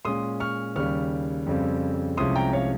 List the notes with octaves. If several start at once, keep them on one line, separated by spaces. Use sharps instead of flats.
A#2 G#3 C#4 C6 D#6
C#6 F6
D#2 C#3 G3 C#6 F6
F2 C#3 G3 C4
C2 C3 F3 G#3 C#4 C6 D#6
G5 A#5
C#5 F5